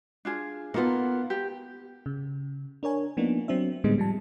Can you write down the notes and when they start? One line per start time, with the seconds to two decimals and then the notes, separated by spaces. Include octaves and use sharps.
0.25 D4 F4 G#4
0.74 A#3 B3 D#4 F4 A4
1.30 G4
2.06 C#3
2.83 D4 A#4 C#5 G#5
3.17 F3 A#3 B3 D4 D#4
3.48 F#3 C4 D4 E5
3.84 A2 D3 G3 G#3 B3 D#4
3.98 F3 G3 A5